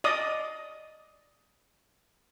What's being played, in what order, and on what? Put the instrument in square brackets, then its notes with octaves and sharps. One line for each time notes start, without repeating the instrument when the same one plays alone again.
[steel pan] D5 D#5 D#6